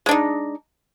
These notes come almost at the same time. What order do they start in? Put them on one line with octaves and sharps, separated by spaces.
G#3 D4 D#4